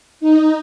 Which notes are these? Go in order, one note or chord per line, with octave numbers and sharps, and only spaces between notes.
D#4